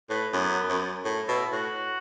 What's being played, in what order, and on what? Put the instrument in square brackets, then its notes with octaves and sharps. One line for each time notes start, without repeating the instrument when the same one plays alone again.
[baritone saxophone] A2 [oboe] B4
[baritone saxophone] F#2 [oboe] B3
[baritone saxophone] F#2
A2
[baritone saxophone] B2 [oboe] E4
[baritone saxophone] A2 [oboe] F#4